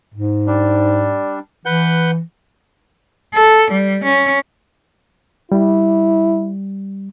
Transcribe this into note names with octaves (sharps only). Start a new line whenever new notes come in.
G#2
G3 D4
E3 B4 F#5 G6
A4
G3
C#4
G3 E4